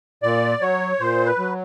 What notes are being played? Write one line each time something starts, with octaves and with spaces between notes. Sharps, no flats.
A#2 D5
F#3 C#5
A#2 C5
B4
F#3